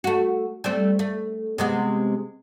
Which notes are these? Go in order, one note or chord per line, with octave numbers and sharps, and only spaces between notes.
A3 F#4
G3 A3 C4
A3
C3 G#3 B3